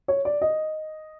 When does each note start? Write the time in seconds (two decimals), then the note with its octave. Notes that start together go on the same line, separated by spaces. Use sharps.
0.08 C#5
0.25 D5
0.42 D#5